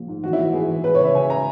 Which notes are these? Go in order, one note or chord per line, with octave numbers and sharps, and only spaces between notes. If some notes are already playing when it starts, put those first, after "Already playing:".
Already playing: A#1
G#2
E3 F#4
E4
E3
B3 G#4
E3
G#3 B4
C#5
C#3
E5
C#3 G#5
G#3 A#5